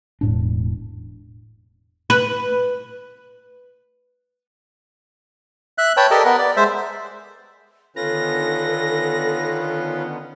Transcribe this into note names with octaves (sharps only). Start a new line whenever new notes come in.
E1 A2 D4
B4
E5 F#6
B4 C#5 G5 A5
G4 A4 A#4 D5 D#5 A5
B3 A#4 B4
D5
G#3 C5 E5
D3 D#3 B3 C#4 F4 A4 B4 A#6